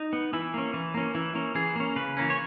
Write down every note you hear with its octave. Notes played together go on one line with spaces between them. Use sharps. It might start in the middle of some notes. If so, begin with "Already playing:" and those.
Already playing: D#4
B3
E3 E4
A#3 C#4
E3
A#3 C#4
E3 E4
A#3 C#4
E3 G#4
A#3 C#4
C#3 B4
E3 A#3 C#4
C#5